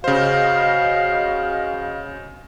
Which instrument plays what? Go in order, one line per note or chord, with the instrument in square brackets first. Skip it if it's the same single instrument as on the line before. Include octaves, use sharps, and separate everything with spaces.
[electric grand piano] C#3 C5 [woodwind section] F#4 D#5 F5